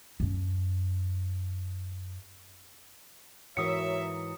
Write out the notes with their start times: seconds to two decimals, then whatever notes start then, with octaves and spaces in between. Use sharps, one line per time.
0.20 F#2 C#4
3.57 G#2 E3 F#3 A#4 C#5 E5 D#6 C#7